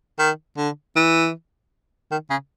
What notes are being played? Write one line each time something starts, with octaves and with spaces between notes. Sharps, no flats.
D#3
D3
E3
D#3
C#3